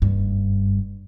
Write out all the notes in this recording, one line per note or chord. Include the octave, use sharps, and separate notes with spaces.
F#1 G2